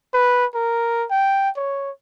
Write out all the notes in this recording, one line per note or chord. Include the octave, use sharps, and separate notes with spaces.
B4
A#4
G5
C#5